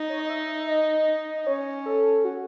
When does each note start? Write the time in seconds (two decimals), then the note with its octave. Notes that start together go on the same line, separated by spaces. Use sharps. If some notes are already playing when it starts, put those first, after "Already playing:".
Already playing: D#4
0.10 C#5
0.19 D#5
0.30 E5
0.68 D#5
1.38 D#5
1.47 C#4 C#5
1.86 A4
2.25 F#4